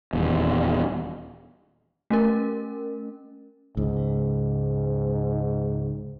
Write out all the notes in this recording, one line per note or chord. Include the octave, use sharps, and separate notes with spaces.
D#1 E2
A3 C#4 A#4
C#2 G#2